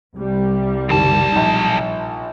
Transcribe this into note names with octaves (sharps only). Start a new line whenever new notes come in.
C2 G3
F#1 B1 D#3 A5
A#1 D#4